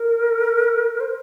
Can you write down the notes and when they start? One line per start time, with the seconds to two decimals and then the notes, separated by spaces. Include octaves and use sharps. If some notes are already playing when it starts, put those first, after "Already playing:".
Already playing: A#4
1.00 C5